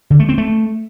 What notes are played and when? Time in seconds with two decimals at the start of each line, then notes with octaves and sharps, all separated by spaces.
0.10 D3
0.20 A3
0.29 C4
0.38 A3